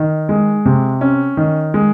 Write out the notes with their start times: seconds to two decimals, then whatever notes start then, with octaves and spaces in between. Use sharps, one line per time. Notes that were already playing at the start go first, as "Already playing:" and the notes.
Already playing: D#3
0.29 G#3
0.65 C3
1.01 C#4
1.37 D#3
1.74 G#3